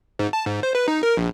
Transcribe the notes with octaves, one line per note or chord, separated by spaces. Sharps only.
G#2
A5
G#2
C5
B4
D#4
A#4
A#1